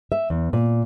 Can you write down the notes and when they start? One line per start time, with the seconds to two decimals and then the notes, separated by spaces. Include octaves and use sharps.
0.12 E5
0.30 E2
0.53 A#2